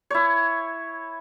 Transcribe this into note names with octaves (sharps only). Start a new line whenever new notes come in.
E4 C#5